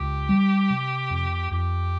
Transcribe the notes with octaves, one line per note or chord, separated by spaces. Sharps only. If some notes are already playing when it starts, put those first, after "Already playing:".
Already playing: C#2 G4
G3
C3
F2
F2 G4